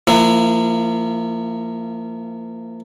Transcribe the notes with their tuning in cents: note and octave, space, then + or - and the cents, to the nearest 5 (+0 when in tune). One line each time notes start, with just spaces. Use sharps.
F3 -30 A#3 -25 E4 +0